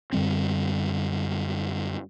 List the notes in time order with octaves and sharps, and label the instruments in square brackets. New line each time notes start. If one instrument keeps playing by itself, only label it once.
[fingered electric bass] F#2 D3 G3 C4